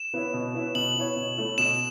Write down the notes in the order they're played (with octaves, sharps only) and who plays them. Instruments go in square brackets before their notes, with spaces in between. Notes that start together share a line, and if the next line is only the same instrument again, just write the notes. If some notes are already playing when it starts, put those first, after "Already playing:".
Already playing: [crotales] E7
[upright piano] B3 E4 C#5
B2
B3 E4 C#5
[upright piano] B2 [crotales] F#7
[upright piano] B3 E4 C#5
B2
A3 E4 C#5
[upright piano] B2 [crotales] E7